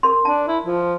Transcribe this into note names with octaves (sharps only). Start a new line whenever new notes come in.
A#4 C6
D4 A5
E4
F3